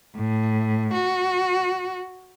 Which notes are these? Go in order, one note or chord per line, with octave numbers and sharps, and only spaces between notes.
A2
F#4